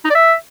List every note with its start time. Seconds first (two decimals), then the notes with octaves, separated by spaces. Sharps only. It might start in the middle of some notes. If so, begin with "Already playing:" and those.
0.05 D#4
0.10 D5
0.15 E5